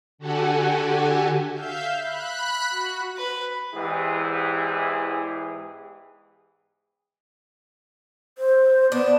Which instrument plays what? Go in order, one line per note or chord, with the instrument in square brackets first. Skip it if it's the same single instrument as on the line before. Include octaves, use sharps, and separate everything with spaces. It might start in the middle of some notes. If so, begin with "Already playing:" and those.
[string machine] D3 F#4 G4 A4 F#5 G#5
[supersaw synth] E5 F5 G6
B5 F#6
F#4
[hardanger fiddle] B4
[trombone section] E2 G#2 E3 E4 G4 G#4
[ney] C5
[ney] B3 [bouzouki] D4